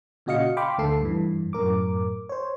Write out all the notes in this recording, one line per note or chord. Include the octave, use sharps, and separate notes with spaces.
A#2 C#3 F#4 D#5 F5 C#7
F5 G5 B5 C6 D6
D2 D3 A3 A4 C7
G2 E3
F#2 A2 A#4 D6
C5 C#5